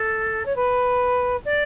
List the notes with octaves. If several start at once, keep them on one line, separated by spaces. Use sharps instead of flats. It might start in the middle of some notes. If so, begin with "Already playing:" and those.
Already playing: A4
C#5
B4
D5